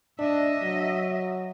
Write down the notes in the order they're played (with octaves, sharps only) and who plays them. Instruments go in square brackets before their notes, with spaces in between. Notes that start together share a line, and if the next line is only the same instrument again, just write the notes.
[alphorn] D4 [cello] D#5 E5
[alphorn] F#3